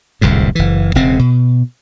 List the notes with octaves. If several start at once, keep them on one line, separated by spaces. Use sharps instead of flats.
D1 C2 F2 G#2
F#1 E3
E1 C#3 C4
B2